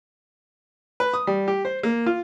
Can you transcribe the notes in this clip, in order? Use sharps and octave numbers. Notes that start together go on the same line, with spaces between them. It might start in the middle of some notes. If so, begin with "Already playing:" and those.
B4
D#6
G3
G4
C5
A#3
F4